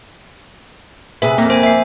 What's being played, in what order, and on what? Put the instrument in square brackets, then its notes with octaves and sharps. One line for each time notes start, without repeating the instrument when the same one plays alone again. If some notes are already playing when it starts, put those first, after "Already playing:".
[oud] C3 G#4 B4 [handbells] E5
[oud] F2 A#3 [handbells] C4
[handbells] C5 G#5
E5 C7